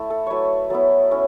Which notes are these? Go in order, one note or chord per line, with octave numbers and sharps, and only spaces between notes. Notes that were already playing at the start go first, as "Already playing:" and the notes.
Already playing: A3 E4
A4
F#3 A3 E4 B4 C#5
F#3 B3 E4 A4
A3 C#4 E4